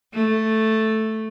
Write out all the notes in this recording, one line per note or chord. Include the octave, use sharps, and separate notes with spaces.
A3